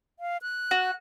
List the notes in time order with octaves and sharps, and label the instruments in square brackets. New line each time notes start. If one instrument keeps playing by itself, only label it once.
[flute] F5
F#6
[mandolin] F#4